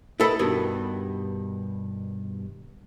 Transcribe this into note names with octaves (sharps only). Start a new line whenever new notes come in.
E4 A4 B4 D#5 B5
G2 B2 D#3